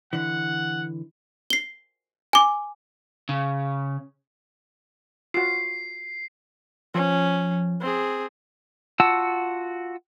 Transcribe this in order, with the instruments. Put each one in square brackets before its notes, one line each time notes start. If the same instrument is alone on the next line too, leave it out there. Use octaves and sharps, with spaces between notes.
[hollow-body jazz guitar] D3 E3 [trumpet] F#5
[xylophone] C7 G7
G#5 D6
[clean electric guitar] C#3
[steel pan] F4 F#4 [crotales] C7
[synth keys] F3 [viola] C#4
[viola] C4 G#4
[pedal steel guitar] F4 F#4 F#5 A5 E6